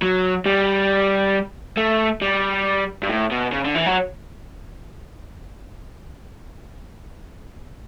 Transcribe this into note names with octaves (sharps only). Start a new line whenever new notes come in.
F#3
G3
A3
G3
G2
A2
B2
C#3
D3
E3
F#3